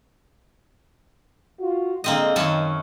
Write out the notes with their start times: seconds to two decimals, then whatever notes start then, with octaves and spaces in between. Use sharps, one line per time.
1.59 F4 F#4
2.04 D3 G#3 A#3 C4 D#5
2.36 F#2 D#3 C#4 A5